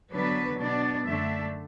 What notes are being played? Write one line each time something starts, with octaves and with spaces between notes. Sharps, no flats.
D3 F#3 B3 D4 B4
B2 B3 D4 D5
F#2 D3 A3 D4 E5